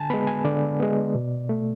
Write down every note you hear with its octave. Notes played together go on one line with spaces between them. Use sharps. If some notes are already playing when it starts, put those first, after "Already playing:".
Already playing: D3 G#5 A5
G#3 B3 B5
G#5
D3 D5
G#3 B3
B2
A3